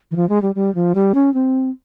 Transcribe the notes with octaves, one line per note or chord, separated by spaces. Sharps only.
E3
F3
G#3
G3
G3
F3
G3
C#4
C4